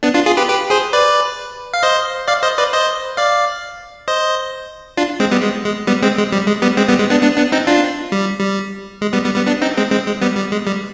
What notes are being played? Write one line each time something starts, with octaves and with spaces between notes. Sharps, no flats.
B3 D4
D4 F4
F4 G#4
G4 B4
G4 B4
G#4 C5
B4 D5
F5
C5 D#5
D5 F5
C5 D#5
B4 D5
C5 D#5
D5 F5
C5 D#5
D4 F4
G#3 C4
G3 B3
G#3
G#3
G3 B3
G#3 C4
G#3
G3
G#3
G3 B3
G#3 C4
G3 B3
G#3
B3 D4
B3 D4
B3 D4
C4 D#4
D4 F4
G3
G3
G#3
G3 B3
G3 B3
G3 B3
B3 D4
C4 D#4
G#3 C4
G#3 C4
G#3
G3 B3
G3
G#3
G3